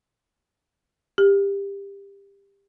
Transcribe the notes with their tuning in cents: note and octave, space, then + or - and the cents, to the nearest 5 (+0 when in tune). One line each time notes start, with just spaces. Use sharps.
G4 +20